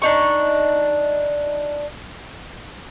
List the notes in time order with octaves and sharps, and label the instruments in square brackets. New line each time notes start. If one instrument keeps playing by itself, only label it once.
[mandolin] D4 D#4 C#6